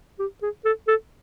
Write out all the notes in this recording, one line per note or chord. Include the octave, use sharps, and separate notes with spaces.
G4
G#4
A4
A4